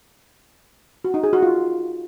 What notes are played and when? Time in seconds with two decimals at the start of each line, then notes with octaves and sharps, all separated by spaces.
1.05 F#4
1.14 D#4
1.24 G#4
1.33 F#4
1.43 F4